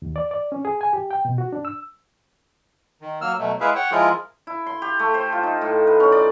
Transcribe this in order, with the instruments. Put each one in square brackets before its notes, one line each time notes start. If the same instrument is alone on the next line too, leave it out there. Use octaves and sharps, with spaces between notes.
[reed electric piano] D#2
D5
D5
C#4
G#4
G#5
G4
G5
B2
F#4
D4
E6
[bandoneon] D#3
F#3 A#3 E6 F6
B2 F#3 A3
G#3 E4 G#4 B4 E5 F5
C#5 F#5 G5
F3 G#3 E4 F4 G#4 A#4
[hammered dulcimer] E4
C6
G4
A3
C5
F4
D#4
A2
B4
C#4
D5